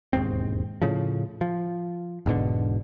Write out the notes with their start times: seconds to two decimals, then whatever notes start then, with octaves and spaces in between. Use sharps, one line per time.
0.13 E1 D#2 G#2 C4
0.82 A2 C#3 F3
1.41 F3
2.26 E1 G#2 B2 D3